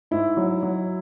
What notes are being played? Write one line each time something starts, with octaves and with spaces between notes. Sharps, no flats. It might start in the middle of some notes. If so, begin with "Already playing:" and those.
G#2 E4
F#3
F#3